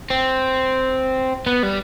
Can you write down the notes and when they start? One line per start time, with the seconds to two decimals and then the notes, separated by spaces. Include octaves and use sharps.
0.10 C4
1.46 B3
1.63 G3